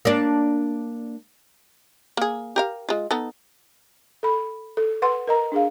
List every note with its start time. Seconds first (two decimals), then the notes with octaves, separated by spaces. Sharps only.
0.05 A#3 D4
2.17 A#3 G#4
2.56 G4 A#4 F5
2.89 G#3 F4
3.11 B3 D#4 A4
4.23 A4 B5
4.77 A4
5.02 B4 F#5 C6
5.28 A#4 D#5 A#5
5.52 D4 G#4 F5